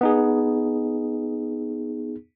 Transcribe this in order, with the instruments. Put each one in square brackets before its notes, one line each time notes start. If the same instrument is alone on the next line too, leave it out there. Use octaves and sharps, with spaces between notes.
[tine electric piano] B3 D#4 G#4